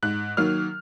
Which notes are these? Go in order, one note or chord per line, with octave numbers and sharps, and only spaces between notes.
G#2 F#6
D#3 F#3 A#3 F6